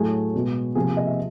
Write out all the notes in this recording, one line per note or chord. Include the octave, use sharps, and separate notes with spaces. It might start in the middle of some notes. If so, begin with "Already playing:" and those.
Already playing: A2 F#3 A3 G#4
B2 G#3
C3 F3 A#3 G#4
D#5
E5